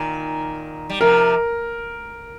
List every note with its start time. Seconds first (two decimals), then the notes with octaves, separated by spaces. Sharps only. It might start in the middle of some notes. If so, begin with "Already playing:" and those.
Already playing: A#2 D#3
0.89 G3
1.01 C3 F3 A#4